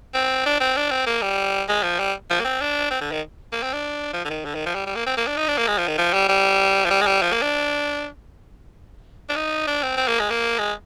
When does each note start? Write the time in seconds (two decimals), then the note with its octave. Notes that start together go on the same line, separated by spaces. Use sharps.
0.14 C4
0.46 D4
0.60 C4
0.77 D4
0.91 C4
1.06 A#3
1.22 G3
1.68 G#3
1.83 F3
1.99 G3
2.30 F3
2.40 A#3
2.44 C4
2.61 D4
2.91 C4
3.01 D3
3.12 D#3
3.52 A#3
3.63 C4
3.73 D4
4.13 F3
4.25 D3
4.30 D#3
4.45 D3
4.55 D#3
4.66 F3
4.75 G3
4.86 G3
4.95 A#3
5.07 C4
5.17 A#3
5.27 D4
5.37 D#4
5.48 D4
5.58 A#3
5.67 G#3
5.78 F3
5.88 D#3
5.98 F3
6.13 G3
6.28 G3
6.85 F3
6.90 G3
7.02 G#3
7.06 G3
7.22 F3
7.32 A#3
7.42 D4
9.29 D4
9.36 D#4
9.67 D4
9.83 C4
9.97 C4
10.08 A#3
10.19 G#3
10.30 A#3
10.58 G#3